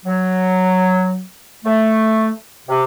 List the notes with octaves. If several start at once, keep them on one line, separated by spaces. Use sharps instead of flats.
F#3
A3
C3